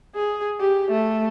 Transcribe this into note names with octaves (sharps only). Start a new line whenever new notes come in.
G#4
G4
A3